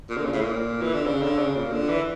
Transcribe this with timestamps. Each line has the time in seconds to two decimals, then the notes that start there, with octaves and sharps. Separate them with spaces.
0.09 A#2
0.17 D3
0.25 C#3
0.33 A2
0.42 A#2
0.82 E3
0.94 D3
1.06 C#3
1.23 D3
1.39 C#3
1.56 A#2
1.72 D3
1.89 E3